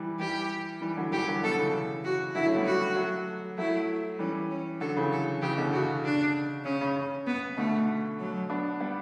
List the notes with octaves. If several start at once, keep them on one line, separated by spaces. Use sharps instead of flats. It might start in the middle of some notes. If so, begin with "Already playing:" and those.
Already playing: E3 G3
E3 G3 G4
E3 G3
D3 F#3
E3 G3 G4
G3
D3 F#3
B2 D3 A4
C#3 E3
F#4
D3 F#3 E4
A3 C#4
G3 B3
F#4
F#3 A3
F#3 A3 E4
E3 G3 C#4
C#4
D3 F#3 A4
C#3 E3
A4
C#3 E3 G4
B2 D3
C#3 F#4
D4
C#3 C#4
C#3
C#3
B3
B2 D3 A3
F#3
B3 D4
G3 B3